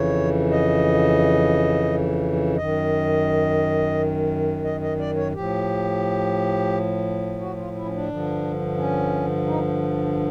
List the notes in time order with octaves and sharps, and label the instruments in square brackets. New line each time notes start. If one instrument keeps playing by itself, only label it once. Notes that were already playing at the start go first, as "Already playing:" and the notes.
Already playing: [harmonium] F2 C#3 E3 C#5
D#5
F#2 D#3 D#5
D#5
D#5
D5
C#5
A2 F3 G4
F#4
F4
E4
C#4
D4
G2 D3 F3
C#4
D#4